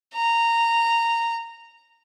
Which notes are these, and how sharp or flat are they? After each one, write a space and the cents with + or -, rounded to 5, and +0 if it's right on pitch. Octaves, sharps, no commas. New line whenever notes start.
A#5 -10